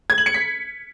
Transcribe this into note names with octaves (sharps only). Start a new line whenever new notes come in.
G#6
F#7
C#7
B6